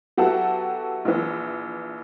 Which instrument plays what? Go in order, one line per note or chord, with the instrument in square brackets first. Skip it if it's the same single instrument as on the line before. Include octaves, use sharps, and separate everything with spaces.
[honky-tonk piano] F#3 B3 E4 F#4 G4 A4
A#1 E3